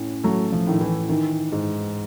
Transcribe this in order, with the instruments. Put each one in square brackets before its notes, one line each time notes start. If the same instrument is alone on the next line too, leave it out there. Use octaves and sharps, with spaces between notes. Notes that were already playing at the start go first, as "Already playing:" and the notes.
Already playing: [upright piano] A2 C#4
[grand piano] F#3 [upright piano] A3
[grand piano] F3
[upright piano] A2 [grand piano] D#3
[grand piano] E3
[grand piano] D#3 [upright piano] E3
[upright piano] G#2